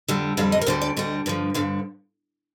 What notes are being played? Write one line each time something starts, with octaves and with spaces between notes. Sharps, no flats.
F2 D3 G3
F2 D3 G3 F5
D#5
A#4
D2 D3 G3 C5
D5
D2 D3 G3 D#5
G2 D3 F3
G2 D3 F3 F5